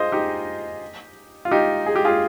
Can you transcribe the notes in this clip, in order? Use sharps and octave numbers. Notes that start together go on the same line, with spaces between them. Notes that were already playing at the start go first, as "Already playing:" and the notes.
Already playing: F4 G#4 C5 D#5
D#4 G4
F4
D#4 G4
G#4
G4
F4 G#4